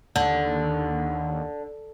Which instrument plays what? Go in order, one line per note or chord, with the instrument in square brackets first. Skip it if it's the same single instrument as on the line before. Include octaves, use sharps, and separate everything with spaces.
[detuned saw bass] D#2 [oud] D3